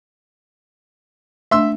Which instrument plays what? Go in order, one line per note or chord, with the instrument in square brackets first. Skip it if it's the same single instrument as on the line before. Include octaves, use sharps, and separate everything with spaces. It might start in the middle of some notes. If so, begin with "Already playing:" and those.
[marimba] A3 D4 [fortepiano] E5 C6 E6